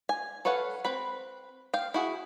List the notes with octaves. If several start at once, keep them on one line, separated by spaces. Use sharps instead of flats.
G#5
A4 B4 C#5 F5 F#5
C4 B4 B5
F5 G5
E4 F#4 G#4